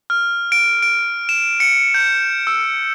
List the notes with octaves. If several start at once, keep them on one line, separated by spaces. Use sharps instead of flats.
F6
D7
D7
E7
C#7
G6
E6